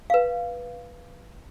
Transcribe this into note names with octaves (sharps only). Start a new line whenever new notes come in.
B4 F5